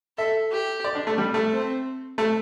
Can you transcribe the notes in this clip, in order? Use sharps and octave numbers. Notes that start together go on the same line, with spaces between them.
A4 E5
G4
D5
D4
A3
G3
A3
C4
A3